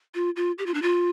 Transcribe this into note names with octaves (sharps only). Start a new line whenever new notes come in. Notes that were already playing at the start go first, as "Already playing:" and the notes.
F4
F4
G4
F4
D4
F4